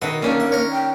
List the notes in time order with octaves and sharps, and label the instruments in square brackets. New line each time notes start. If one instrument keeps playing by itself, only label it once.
[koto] B2 D#3 [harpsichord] E5 F#5
[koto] D#3 C#4 D4 [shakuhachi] A#3
[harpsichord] E5
A#4 C#5
[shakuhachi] G5